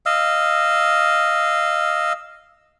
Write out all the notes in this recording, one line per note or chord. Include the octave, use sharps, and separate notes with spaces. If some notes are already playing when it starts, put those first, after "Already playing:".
D#5 F5 E6